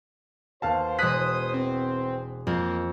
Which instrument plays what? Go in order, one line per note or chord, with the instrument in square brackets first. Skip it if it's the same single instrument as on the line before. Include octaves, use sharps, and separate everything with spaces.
[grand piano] D#2 F5 A5 [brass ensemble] F#4 B4 C5
[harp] E1 F#6 [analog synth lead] D#6 [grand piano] B6
[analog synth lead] C4
[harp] F2 [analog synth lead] A#3